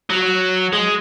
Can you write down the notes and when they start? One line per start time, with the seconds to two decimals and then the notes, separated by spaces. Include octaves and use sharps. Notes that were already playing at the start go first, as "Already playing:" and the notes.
0.10 F#3
0.73 G#3